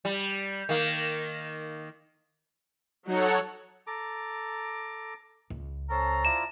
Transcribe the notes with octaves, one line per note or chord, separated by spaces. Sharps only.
G3
D#3 A#3
F#3 D#4 A4 C#5 F#5
A4 A#5 D6
C#2
C#4 A4 C5 A5 A#5
E4 F4 D5 E7